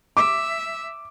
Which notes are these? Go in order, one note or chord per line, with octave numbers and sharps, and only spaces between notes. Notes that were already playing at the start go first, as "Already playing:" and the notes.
E5 D6